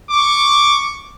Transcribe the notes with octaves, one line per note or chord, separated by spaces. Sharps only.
C#6 D6